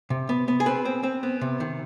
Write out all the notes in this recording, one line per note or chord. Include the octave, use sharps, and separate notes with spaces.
C3
B3
B3
G#4
C4 B4
C4
C4
B3
C3
D#3